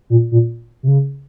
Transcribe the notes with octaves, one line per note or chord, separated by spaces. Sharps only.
A#2
A#2
C3
C#3